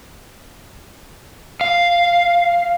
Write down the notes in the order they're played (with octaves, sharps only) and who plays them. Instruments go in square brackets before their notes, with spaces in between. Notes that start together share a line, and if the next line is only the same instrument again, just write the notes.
[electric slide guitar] F5